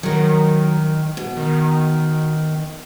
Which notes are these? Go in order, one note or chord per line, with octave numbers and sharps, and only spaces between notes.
D#3 F#3 A#4
B2
D#3